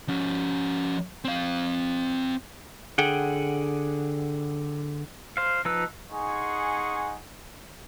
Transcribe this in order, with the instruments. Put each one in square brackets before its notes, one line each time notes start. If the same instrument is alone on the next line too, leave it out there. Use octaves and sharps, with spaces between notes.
[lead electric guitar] F3 C#4
C4 F5
[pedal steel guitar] D3 G#4 F#5 G5
C5 F5
F3 D#4 B4 E6
[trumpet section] D#4 G#4 F#5 G#5 C6 C#6